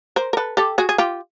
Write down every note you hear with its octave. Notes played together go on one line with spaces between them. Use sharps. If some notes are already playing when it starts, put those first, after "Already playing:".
A#4 C5
A#4
A4 B4
G4 A4
F#4 G#4
G#4
F4 G4